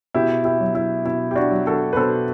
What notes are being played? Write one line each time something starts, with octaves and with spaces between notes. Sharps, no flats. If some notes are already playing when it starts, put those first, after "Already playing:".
B2 E4 G4
E4 G4
F#3
E4
B2 E4
G4
D4 F#4
F#3
F#4 A4
B4
B2 A4 C5